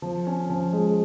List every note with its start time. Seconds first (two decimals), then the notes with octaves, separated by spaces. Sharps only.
0.02 F3
0.27 C#4
0.50 F3
0.73 G#3